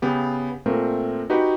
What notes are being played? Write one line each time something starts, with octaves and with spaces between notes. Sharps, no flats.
C#3 B3 G4
A#2 A3 C4 A#4
D#4 F#4 G4 B4